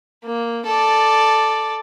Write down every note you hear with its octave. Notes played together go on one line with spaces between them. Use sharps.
A#3
A4 D5